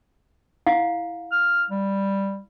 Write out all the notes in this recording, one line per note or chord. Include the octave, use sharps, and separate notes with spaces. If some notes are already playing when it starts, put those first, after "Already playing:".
E4 F5 F#5
F6
G3